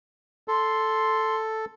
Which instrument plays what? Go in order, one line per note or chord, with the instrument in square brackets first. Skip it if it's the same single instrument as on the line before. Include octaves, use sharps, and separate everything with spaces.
[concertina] A4 [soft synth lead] C6